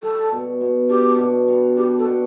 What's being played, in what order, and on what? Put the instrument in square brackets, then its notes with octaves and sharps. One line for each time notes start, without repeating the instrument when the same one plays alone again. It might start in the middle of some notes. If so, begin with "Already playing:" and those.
[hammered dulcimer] G3 [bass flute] A4
[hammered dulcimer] B2
B2
[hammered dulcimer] D4 [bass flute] G4
[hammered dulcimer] B2
G3
[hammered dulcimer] D4 [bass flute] G4
[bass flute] A4
[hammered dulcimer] B2